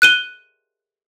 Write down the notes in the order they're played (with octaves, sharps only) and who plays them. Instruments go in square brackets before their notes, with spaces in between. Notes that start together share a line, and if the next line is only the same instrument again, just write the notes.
[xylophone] F#6 D#7 G7